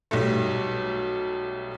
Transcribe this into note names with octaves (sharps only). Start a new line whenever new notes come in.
B1 G3 A3